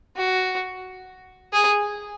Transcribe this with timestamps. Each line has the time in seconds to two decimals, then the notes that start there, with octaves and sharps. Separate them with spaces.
0.17 F#4
1.53 G#4